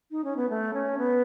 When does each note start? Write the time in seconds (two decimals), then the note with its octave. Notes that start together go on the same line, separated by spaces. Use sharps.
0.11 D#4
0.24 C#4
0.36 B3
0.49 A3
0.74 C#4
0.98 B3